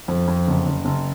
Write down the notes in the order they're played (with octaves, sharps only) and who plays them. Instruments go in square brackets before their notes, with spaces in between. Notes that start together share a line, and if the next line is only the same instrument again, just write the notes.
[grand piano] F2
F2
F#1
F#1
F#1